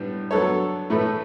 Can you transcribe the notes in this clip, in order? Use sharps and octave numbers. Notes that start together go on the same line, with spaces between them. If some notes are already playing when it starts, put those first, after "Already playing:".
Already playing: A2 G3 B3 D4
F#3 B3 D4 A4 C#5
A2 E3 A3 E4 B4